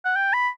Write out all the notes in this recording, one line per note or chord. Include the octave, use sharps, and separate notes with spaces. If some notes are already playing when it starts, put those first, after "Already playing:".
F#5
G5
B5